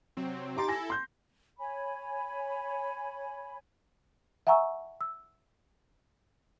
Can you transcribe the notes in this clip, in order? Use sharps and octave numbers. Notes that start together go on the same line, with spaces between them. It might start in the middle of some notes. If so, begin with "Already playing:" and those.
C3 F#3 C4
D#4 G4 A#5 C6 D6 A6
E4 A4 G#5 A#6
C6 G6
C#5 G#5 B5
E5 F#5 G#5 A#5 C#6 E6
E6